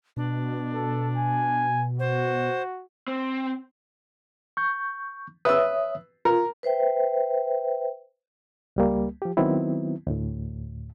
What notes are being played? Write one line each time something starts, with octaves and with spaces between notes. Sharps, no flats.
B2 D4
A4
G#5
F#4 C5
C4
C#6 G6
B4 C#5 E5 D#6 E6
F4 A#4
B4 C5 E5 G5
C#2 G3 A#3
F3 G4
D#3 F#3 B3 C4 E4
D2 A2